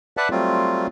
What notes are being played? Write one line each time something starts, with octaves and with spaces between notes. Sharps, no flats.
B4 D5 E5 F#5 A5
F#3 G3 A3 C4 F4